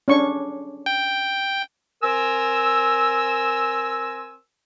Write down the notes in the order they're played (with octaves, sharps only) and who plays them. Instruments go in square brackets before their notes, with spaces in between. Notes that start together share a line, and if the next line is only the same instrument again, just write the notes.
[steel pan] C#4 D4 C#6
[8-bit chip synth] G5
[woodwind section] C4 A#4 G#5 E6